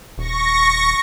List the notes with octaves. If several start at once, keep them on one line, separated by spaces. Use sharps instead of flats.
D#1 C#6 A#6